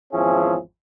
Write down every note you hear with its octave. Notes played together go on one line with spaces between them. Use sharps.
G#1 E2 F3 C#4 E4 G#4